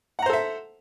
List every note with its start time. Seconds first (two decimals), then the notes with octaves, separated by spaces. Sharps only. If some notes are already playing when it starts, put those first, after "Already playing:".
0.19 F#5
0.22 A#5
0.26 C5
0.30 A4
0.33 E5